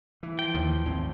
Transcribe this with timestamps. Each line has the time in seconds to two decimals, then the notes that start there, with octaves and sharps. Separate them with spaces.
0.23 E3
0.39 F3 G5
0.55 D#2
0.86 G#1 A2 C4